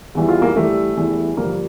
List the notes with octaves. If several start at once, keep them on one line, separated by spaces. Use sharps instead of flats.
E2 E3 G3
F4
A#3
G2 E3 G3 A3
E2 E3 G3
G2 D3 F3 A#3